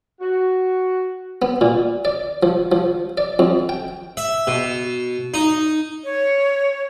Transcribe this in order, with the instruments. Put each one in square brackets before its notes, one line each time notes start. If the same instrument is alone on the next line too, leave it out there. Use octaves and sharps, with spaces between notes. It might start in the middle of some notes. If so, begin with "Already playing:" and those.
[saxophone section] F#4
[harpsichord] B3
A#2
D5
F3
F3
D5
F2
G5
E5
B2
D#4
[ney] C#5